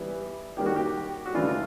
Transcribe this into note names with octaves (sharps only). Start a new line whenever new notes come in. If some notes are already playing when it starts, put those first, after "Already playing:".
Already playing: E3 G3 B3
D#3 G3 A#3 G4
F#4
G4
F#4
C#3 E3 A3 D4 F4
F4